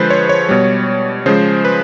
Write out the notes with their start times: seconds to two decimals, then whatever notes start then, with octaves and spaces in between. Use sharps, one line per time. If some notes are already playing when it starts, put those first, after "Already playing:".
Already playing: D3 F3 G#3 B4 C5
0.10 C#5
0.29 C#5
0.49 B2 G3
1.26 C#3 F3 G#3 C5
1.65 B4